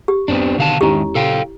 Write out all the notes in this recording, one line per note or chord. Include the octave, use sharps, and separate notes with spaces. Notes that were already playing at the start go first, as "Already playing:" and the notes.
G4
D1 F#2 B3 C4 D4
B2 D3 D#3 F5 A5
E2 G#2 D#3 G#3 C#4 E4 G4
A#2 C#3 A4 F5 G5